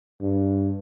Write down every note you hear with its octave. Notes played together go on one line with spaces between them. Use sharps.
G2